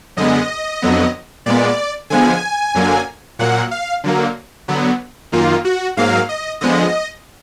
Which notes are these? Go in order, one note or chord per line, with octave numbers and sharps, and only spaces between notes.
F#2 D3 G#3 B3 D#5
F2 D3 F#3 B3
A#2 G#3 B3 D5
D3 F3 G#3 B3 G#5
F#2 D3 F#3 A#3
A#2 F#3 A#3 F#5
F5
D3 F#3 A#3
D3 F#3 B3
F#2 D#3 A#3 F4
F#4
G#2 F#3 A#3 F5
D#5
D3 F3 G#3 B3 D#5